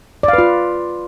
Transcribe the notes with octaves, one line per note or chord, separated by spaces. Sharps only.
D5
F5
B4
F4